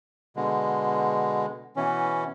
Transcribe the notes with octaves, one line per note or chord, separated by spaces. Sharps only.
B2 D3 G#3
B2 E3 C#4